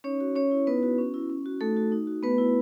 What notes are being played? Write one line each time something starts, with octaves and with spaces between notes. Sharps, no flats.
C#4 D#4 C#5
F#4
C#4 C#5
E4
B3 D#4 B4
F#4
C#4
E4
C#4
F#4
A3 D#4 A4
F#4
D#4
F#4
A3 B3 B4
E4